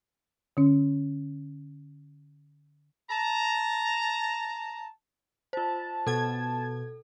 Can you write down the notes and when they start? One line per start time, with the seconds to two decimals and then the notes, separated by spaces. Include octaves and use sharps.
0.57 D3 C#4
3.10 A5 A#5
5.53 F4 C5 A5
6.07 B2 A4 G#6